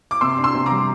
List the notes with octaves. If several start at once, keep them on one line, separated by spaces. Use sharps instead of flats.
D6
C3 C6 E6
D4
C6 E6
C3
A#5 D6
G3